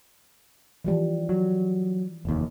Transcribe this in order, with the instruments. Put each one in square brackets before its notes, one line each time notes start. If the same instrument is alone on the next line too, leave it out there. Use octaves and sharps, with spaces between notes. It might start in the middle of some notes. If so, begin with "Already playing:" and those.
[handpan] E3 F3 G3
[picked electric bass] F#3
F1 D#2